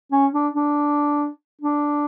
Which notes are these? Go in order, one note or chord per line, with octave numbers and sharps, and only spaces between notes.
C#4
D4
D4
D4